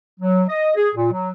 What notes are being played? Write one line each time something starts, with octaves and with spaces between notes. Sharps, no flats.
F#3
D#5
G#4
A#2
F#3